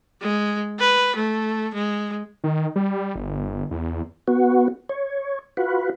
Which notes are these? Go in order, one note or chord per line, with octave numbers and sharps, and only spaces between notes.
G#3
B4
A3
G#3
D#3
G3
G1
E2
B3 F#4
C#5
F4 F#4 B4